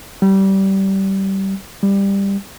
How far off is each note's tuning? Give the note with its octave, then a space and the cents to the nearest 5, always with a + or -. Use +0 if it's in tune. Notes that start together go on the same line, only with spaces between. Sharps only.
G3 -20
G3 +15